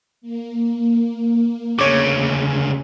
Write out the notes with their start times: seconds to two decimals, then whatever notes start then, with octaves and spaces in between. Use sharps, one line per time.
0.21 A#3
1.79 D2 C#3 C#5 D6